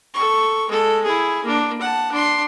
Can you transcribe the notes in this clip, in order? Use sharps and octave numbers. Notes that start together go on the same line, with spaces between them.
A4 C#6
G#3 A4
E4 G#4
A#3 D4
F#5 A5
D4 C6